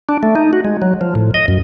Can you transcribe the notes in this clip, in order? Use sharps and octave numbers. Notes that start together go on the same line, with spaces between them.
D4
A3
D#4
F#4
G#3
F#3
F3
A2
D#5
F#2